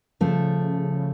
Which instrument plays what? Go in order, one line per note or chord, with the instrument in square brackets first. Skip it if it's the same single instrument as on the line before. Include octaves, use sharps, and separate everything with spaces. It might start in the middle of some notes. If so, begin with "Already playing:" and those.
[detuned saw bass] C#3 [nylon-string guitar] F3 A3